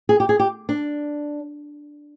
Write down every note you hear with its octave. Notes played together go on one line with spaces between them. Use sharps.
G#4
G4
G#4
G4
D4